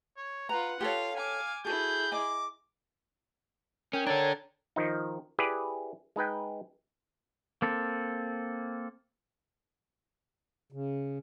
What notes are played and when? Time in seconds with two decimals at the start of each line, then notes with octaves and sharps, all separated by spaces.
0.17 C#5
0.49 F4 B4 F#5 A#5
0.81 F4 G4 A4 C#5 F5
1.17 F5 G#5 D6
1.65 E4 F#4 G#4 A4 G6
2.12 D#5 G#5 D6
3.93 C#4 A#4 G5 G6
4.07 D4 A4 C#5 A#5 G#6 A6
4.76 D#3 F3 D#4
5.39 E4 G4 G#4 B4 D5
6.16 G#3 D#4 B4 G5
7.62 A#3 C4 A4
10.72 C#3